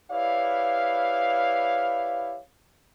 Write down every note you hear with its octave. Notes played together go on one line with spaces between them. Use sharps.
E4 G4 B4 C#5 D5 F5